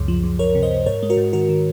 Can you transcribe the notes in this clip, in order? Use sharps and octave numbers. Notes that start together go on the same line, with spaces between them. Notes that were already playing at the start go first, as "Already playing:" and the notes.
Already playing: C#2 F#2
F3
C#2
C#2 A#4 C#5
C3
C5 D#5
C3
G#2 A#4 C#5
G#3
F#4 A#4
G#2
D#3 F#4 A#4
D#3